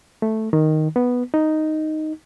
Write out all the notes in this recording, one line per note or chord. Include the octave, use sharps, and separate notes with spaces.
A3
D#3
B3
D#4